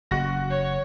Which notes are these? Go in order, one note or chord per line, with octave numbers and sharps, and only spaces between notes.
F#1 F#4 A#6
C#5